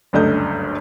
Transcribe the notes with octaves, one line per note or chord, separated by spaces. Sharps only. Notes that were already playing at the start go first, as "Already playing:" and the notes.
F#1 D2 G2 A3 D#5 G6